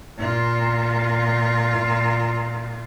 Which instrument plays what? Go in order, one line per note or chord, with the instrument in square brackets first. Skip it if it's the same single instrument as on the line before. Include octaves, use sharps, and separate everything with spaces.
[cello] A#2 F4